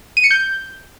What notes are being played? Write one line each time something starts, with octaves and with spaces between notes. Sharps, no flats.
D#7
C#7
G6